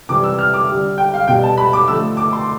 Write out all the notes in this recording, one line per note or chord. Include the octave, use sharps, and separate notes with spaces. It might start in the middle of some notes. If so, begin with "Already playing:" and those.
C3 E3 G3 D6
E6
F6
D6
D3 G3
G5
F5
B2 G3 G5
A5
B5
D6
D3 F3 A3 E6
D6
C6